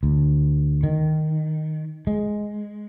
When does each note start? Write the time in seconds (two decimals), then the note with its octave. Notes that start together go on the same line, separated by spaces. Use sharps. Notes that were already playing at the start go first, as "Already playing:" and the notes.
0.03 D2
0.83 D#3
2.07 G#3